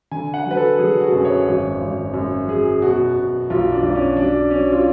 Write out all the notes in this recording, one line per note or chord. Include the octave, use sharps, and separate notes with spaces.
D3 G#5
F#5
F#3 B4
A4
F#3 G#4
F#4
F#2
C#5
G#1
G#1
F#2
F#3 G#4
B2 F#4
B2
B1 F4
D4
B1
C#4
F#3 D4
F#3 C#4
F4